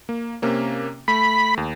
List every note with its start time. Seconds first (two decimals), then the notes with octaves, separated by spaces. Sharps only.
0.09 A#3
0.42 C3 A#3 C#4
1.08 A3 B5
1.57 D#2